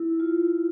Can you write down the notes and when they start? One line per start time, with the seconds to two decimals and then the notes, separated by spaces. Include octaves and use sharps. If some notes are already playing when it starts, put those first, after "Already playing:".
Already playing: E4
0.20 F4